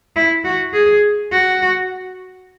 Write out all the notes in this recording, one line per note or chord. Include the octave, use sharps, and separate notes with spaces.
E4
F#4
G#4
F#4